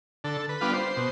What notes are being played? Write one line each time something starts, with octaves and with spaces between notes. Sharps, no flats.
D3 A4
B4
G3 B3 D4 F4
C5
B2